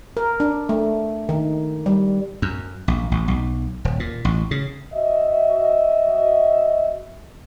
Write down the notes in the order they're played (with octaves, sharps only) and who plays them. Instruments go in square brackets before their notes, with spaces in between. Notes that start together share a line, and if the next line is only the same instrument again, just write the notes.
[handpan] A#4
D4
A3
D#3
G3
[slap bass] F#2
A#1
A1
B1
D#1
A#2
A1
C#3
[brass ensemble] F#4 D#5 E5